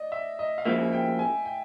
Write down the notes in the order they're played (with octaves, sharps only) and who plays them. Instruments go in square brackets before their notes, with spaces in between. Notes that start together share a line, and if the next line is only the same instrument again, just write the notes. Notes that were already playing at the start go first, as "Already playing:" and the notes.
Already playing: [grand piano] D5 D#5
E5
D#5
F5
[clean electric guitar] C#3 F3 A#3 [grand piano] E5
[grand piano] G5
G#5
G5